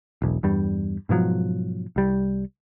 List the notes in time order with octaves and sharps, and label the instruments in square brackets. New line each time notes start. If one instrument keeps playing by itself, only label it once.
[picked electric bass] E1 B1
E2 G2 G3
G#2 B2 F3 F#3
C2 G3